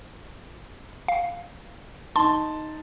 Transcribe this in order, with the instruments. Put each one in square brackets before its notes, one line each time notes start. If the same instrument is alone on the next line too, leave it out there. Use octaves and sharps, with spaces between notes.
[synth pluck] F5
[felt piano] D#4 A5 [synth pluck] C6